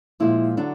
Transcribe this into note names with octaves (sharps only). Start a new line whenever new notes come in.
A#2 F3 G#3 E4
D3 F#3 D4